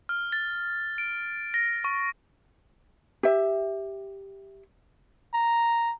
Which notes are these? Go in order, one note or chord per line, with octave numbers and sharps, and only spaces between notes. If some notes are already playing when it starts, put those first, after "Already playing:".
F6
A6
D7
A#6
C#6
G4 E5
A#5